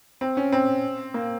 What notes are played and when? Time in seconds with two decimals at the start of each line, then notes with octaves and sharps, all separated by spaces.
0.21 C4
0.37 C#4
0.52 C4
1.14 A#3